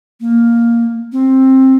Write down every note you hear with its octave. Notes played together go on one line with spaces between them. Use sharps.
A#3
C4